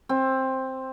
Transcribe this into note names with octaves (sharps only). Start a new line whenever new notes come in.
C4